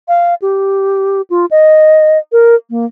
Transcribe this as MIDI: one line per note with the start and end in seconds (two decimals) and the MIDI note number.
0.08 0.34 77
0.42 1.22 67
1.30 1.46 65
1.51 2.18 75
2.32 2.55 70
2.70 2.85 58